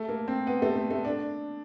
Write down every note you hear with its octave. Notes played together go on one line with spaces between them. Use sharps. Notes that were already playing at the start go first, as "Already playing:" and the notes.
Already playing: A3
A#3
C4
B3
A3
A3
A3
D4